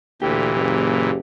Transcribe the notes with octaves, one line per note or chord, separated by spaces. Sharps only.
D2 A#2 E3 G4
F#1